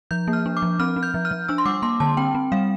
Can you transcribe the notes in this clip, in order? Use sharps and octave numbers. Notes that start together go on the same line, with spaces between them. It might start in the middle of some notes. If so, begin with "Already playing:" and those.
F3 G6
A#3
F6
D4
D6
F3
C4 F6
C4
G6
F3
F6
F3
D4 E6
C6
G3 D6
A#3 C6
D3 A5
C4 G5
C4
G3 F5